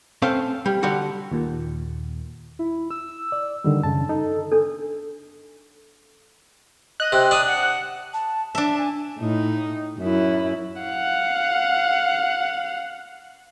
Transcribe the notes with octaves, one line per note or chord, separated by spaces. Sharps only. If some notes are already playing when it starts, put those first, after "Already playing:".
A3 C4 C#4 A4 C5 F5
G3
D3 G3 F#4 A4
D#2 A#2
E4
E6
D5
D3 D#3 G3
F#2 C#3 A5
D#4 A4
D4 A4
D#5 F#6
C3
D4 D#6
F#5
A5
D4 E5 A5
G#5
A2 D#4
F#2 E4
F5 F#5